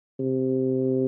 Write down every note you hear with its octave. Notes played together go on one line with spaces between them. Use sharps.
C3